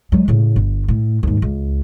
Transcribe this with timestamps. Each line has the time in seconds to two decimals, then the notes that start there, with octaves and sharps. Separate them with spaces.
0.12 F#3 G#3
0.28 A2 C#3
0.56 G1
0.88 A2
1.23 D#2 G#2
1.42 C#2